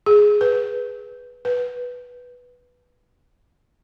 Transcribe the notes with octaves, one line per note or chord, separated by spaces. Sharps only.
G#4
B4
B4